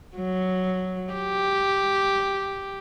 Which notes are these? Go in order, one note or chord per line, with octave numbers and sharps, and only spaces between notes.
F#3
G4